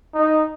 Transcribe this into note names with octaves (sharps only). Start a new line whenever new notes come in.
D#4